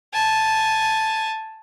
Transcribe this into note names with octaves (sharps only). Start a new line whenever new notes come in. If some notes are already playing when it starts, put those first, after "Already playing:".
G#5 A5